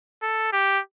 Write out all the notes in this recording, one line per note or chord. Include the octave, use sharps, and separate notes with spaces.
A4
G4